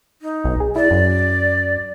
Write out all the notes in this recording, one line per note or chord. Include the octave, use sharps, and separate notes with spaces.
D#4
B1
G#4
E4 D5
F#2